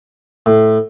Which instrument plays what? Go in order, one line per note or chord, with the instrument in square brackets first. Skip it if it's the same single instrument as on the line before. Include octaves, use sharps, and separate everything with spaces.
[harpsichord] A2